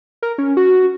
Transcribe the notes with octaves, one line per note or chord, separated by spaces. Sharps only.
A#4
C#4
F#4